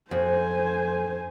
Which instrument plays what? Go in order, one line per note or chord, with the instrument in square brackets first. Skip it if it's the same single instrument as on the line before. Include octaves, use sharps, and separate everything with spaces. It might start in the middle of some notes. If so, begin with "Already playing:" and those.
[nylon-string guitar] F2 [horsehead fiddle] C5 G#5